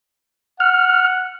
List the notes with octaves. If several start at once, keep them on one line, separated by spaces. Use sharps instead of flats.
F#5 F6